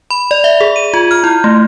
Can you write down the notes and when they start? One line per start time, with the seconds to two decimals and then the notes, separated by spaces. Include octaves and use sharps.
0.11 B5
0.31 D5
0.44 E5
0.61 G#4
0.76 D#7
0.94 F4
1.11 F6
1.24 E4
1.44 A3